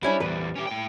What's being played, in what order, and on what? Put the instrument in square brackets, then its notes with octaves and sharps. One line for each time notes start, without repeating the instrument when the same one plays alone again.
[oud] G3 C#4 D4 [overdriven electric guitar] E4
[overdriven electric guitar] E2 G3 [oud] B4
[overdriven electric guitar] C#4 G4
A2 G5